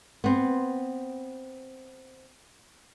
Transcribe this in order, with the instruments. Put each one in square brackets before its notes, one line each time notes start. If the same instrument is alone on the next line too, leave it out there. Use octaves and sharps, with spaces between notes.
[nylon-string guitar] B3 C4